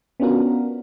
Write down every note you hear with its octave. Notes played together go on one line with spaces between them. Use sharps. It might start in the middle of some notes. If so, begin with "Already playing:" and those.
B3 C#4 D4 F4 F#4 A#4